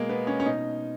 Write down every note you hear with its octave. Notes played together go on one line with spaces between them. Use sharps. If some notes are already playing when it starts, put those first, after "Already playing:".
Already playing: B2 G#3 A#3
B3
C#4
C#4
B2 D#4